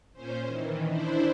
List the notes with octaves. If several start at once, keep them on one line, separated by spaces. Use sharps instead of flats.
A#2 C#4 C5
D#3 E3
D4 E4 C5